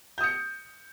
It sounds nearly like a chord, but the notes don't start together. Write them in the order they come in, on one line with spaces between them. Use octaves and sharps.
G6 D#6 C#7